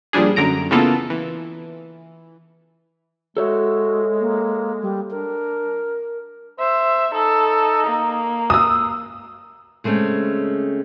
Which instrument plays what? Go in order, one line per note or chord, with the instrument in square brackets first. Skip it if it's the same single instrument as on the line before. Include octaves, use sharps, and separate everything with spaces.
[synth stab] A#2 F3 G3 D4 G#4
F#2 D3 A#5 D7
C#3 E3 A#3 B3 F4 A4
E3
[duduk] G#3 [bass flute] F#4 [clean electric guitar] A4 C#5 E5
[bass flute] A#3
G3
[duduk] D4 [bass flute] A#4
[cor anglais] C5 [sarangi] E5
[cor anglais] D#4 [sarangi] A4
[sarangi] A#3
[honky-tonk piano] D#6 E6
[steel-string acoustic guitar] C#3 G#3 A3 C4 C#4